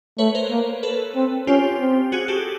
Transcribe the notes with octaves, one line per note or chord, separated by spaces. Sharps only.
A3 B4 C#5
A#4 C5
A#3
A4 B4
C4
C#4 F4 G4
C4
F#4 G#4
G4 A4